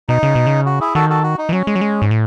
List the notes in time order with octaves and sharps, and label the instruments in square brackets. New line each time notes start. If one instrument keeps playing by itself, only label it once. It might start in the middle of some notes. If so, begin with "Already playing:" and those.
[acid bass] B2 [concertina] D#4
[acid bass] C#3
B2
C#3
[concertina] F#4
E4 G#4
[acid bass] D#3 [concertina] F#4 A4
[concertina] F#4 A4
F#4
D#4
[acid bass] E3
[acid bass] F#3 [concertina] C#4
[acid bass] G#3
F#3
G#3
G#2
A2